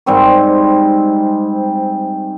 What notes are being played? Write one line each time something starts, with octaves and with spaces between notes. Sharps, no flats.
G#2 G3 C4 C#6